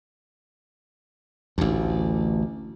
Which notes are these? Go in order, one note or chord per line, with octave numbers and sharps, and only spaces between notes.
A1 D2